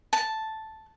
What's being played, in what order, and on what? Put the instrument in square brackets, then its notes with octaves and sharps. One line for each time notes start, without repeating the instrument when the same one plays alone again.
[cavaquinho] A5